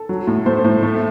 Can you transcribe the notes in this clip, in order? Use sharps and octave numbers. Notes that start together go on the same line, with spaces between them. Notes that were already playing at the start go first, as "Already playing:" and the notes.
Already playing: A4
F#3
A2
A3 C5
A2
A3